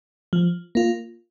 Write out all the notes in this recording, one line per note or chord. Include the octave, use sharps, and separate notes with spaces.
F3
A#3 F4